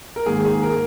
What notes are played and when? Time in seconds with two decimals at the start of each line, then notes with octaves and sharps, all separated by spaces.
0.16 A#4
0.26 G#2 D#3 A#3 G#4
0.45 G#4
0.63 A#4